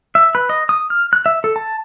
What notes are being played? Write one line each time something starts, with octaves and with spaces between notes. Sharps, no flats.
E5
B4
D#5
D#6
F6
F#6
E5
A4
A5